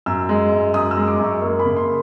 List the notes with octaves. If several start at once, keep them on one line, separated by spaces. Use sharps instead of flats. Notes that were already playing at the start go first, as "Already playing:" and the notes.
F#2 E6
G#3
F#2
F#2 D#6
E6
G#3
D6
F#2
C#6
A#3
B5
C#3
C6